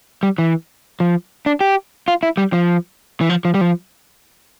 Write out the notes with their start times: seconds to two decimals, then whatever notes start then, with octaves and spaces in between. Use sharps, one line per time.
0.23 G3
0.38 E3
1.00 F3
1.46 D4
1.61 G4
2.08 F4
2.23 E4
2.37 G3
2.53 F3
3.21 E3
3.29 F3
3.45 F3
3.54 G3
3.61 F3